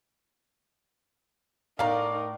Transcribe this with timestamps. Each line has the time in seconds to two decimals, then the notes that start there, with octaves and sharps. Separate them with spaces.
1.79 A2 D#4 A#4 D5 F5 A#5